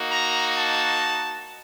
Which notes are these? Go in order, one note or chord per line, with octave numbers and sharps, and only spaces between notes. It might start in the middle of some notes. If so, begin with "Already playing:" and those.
Already playing: A#3 D#4 F#4
A#5
A5